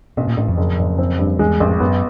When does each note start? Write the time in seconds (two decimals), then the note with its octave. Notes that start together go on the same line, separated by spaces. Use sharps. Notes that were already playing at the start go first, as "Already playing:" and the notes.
0.17 A1 B2
0.28 A#2
0.37 A1 A2
0.48 F2
0.57 F#1
0.79 F#1
0.98 C4
1.19 G2
1.39 E2 G#3
1.60 A1 F2
1.80 F#2 B3